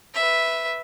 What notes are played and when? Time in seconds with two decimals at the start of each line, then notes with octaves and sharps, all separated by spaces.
0.15 B4 E5